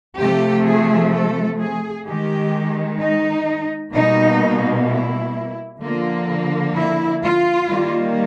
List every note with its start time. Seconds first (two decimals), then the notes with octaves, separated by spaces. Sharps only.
0.18 C3 F3 A3 G4
0.66 G#4
1.13 A4
1.60 G#4
2.06 D#3 G#3 G4
3.00 D#4
3.94 B2 G3 A#3 D#4
4.89 E4
5.82 D3 F3 A#3 F4
6.76 E4
7.24 F4
7.70 D#3 G3 A#3